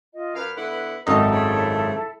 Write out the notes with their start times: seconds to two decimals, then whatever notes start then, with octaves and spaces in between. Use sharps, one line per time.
0.13 F4 D#5
0.35 F#2 B4 F5
0.57 D3 B3 E4
1.07 G#1 F#2 D#4 E4 A4 D#5 E5
1.32 G#2 C#3